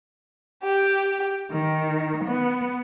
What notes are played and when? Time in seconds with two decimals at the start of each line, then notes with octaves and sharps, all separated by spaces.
0.63 G4
1.52 D#3
2.25 B3